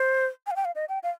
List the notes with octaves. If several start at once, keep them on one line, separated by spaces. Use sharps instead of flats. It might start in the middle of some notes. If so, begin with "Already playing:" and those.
Already playing: C5
G#5
F5
G5
F5
D#5
G5
F5